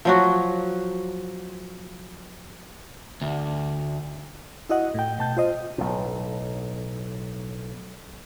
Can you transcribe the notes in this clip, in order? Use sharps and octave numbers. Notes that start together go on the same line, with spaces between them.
F3 F#3 F#4
D2
E4 F#4 D#5 F#5
A2 G5
B2 A5 G6
F4 C5 D#5
B1 A2